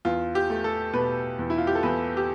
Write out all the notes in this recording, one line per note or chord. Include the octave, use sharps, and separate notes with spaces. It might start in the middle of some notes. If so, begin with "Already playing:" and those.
E2 F4
G4
A3
A4
B2 B4
E2
E4
F4
G4
A4
E2 B4
G4